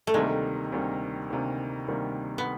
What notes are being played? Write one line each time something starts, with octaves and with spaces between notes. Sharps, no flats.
A3
D2 C3 D#3 G3 G#3 A#3
D2 C3 D#3 G3 A#3
D2 C3 D#3 G3 A#3
D2 C3 D#3 G3 A#3
B3